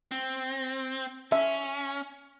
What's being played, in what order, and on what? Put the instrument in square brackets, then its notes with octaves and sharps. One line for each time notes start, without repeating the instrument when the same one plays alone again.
[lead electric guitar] C4
[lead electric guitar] C#4 [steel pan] E5